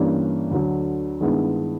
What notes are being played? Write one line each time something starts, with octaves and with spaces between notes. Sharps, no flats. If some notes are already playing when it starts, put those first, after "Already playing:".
Already playing: G2 E3 G3 A#3 C#4
D2 D3 F#3
G2 D#3 G#3 B3 E4